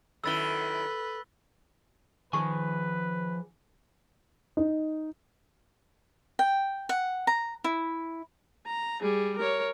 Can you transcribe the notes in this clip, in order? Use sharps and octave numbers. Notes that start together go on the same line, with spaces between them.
F#2 D#3 E4 A4 B4 E6 A6 G7
D#3 F3 G#4 B4 G#5 A5 C#6
D#4
G5
F#5
A#5
E4
A#5
G3 G#4
A#4 C#5